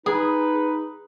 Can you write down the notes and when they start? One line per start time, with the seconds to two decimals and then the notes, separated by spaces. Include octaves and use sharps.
0.06 D#4 G#4 B4